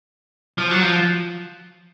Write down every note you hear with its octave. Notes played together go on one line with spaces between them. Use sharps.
F3
F#3
F3